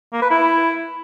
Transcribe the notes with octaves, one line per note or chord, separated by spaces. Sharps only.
A#3
B4
E4